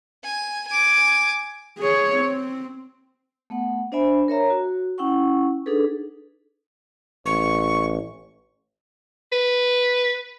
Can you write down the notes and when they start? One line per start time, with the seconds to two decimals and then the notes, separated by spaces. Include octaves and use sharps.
0.24 G#5
0.68 G#5 D6
1.78 G#4 C#5
2.16 C4
3.50 A3 B3 F#5
3.92 D4 C5 D5 E5 G#5 B5
4.28 A#4 C#5 E5 A#5
4.50 F#4
4.98 C#4 E4 F#5 G5 C#6
5.66 D4 D#4 G#4 A4 B4
7.26 A1 C#6
9.32 B4